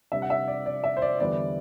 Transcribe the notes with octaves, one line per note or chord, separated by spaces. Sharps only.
C3 G3 D4 E5
F#5
E5
D5
D5
E5
C5
D5
E2 D3 G3 B3 E4 D5